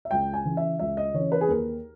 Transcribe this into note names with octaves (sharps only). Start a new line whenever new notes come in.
E5
C#2 G5
G#5
C#3 E3
E5
C#2 E5
D#5
C#3 E3 C#5
B4
G#4
D#2 A#4